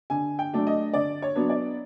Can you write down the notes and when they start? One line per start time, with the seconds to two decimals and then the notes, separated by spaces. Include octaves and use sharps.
0.10 D3 G#5
0.39 G5
0.53 F#3 A3 D4
0.67 D#5
0.94 D3 D5
1.22 C#5
1.36 F#3 B3 D4
1.49 D5